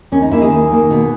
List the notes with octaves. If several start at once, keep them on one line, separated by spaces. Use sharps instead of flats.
D#2 C#4
D#4
D#3 A#3 E4
G#4
D#2
D#3 A#3
B2